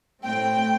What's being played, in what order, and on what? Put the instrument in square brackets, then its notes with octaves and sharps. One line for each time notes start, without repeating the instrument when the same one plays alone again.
[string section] A2 A3 C4 G5